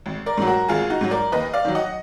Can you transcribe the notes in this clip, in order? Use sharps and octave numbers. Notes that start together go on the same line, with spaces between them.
G#1
A#4 D5
G#2 F#3
F#4 A#4
G#1 F4 G#4
D#4 F#4
G#2 F#3
A#4 D5
D#2 B4 D#5
D5 F5
D#3 F#3
D#5 F#5